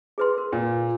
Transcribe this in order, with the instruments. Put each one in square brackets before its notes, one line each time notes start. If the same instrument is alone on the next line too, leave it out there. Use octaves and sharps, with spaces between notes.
[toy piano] G#4 B4 C6
A#4
[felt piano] A#2